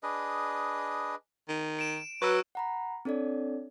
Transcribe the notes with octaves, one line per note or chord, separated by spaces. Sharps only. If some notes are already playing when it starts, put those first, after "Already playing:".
D4 G#4 B4 D#5
D#3
D7 E7
F#3 F#4 B4 C#6 E6
F#5 A#5 B5
C4 D4 A4 C#5 D5